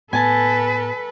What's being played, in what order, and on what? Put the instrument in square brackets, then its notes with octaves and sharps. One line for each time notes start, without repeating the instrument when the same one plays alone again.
[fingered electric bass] A2 B3 [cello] A4 B4 [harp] G#5 A5